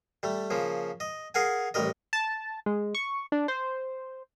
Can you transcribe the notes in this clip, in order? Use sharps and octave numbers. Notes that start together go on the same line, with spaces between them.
G3 A3
C#3 F3 A#3
D#5
G#4 A#4 F5 F#5 G#5
A1 G3 A#4 D#5
A5
G#3
C#6
D4
C5